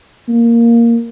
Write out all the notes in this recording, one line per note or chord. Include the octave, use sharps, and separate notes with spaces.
A#3